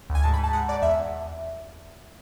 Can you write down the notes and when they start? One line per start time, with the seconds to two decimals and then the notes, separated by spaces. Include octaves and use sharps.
0.10 D2
0.15 G#5
0.23 G#2 A5
0.33 B5
0.38 G#2
0.44 A5
0.53 G#2 F#5
0.68 G#2 D5
0.82 E2 E5